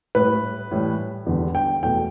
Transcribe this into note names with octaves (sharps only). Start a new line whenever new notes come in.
A2 G3 B4
A2 E3 G3
E2 D3 G3
G5
E2 B2 A3 G5